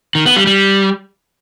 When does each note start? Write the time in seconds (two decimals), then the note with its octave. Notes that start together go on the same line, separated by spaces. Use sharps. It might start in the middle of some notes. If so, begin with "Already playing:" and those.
0.15 D#3
0.26 B3
0.36 G3
0.47 G3